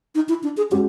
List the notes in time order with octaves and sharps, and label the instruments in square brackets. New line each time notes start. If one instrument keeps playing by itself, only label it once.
[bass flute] D#4
E4
D4
G#4
[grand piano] G#3 C#4 F#4 [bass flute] G4